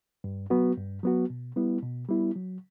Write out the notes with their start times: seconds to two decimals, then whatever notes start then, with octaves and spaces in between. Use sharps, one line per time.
0.24 G2
0.50 F#3 B3 F#4
0.77 G2
1.03 F#3 B3 F#4
1.30 B2
1.56 G3 B3 E4
1.83 B2
2.09 G3 B3 E4
2.36 F#3